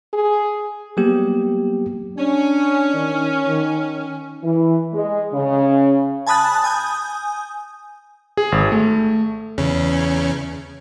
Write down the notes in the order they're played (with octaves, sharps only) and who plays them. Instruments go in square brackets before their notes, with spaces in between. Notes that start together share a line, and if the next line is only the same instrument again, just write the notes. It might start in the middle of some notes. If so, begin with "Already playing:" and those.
[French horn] G#4
[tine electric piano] F#3 G3 A#3 B3 G4
[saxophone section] C#4 [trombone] D4
[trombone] D#3
D#3
[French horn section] E3
G#3
C#3
[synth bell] G#5 A5 B5 D#6 F#6 A6
G#5 D#6 G6
[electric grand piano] G#4
G#1
A3
[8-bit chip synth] E2 C#3 C#4